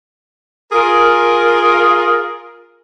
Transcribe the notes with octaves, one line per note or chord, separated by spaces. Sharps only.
F4 G#4 A#4